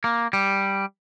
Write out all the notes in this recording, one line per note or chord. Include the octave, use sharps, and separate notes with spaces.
A#3
G3